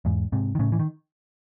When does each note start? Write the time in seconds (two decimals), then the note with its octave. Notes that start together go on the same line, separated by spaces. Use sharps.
0.05 E2 G#2
0.32 G#2 C3
0.55 D#3
0.59 A2 C#3
0.72 E3
0.79 D#3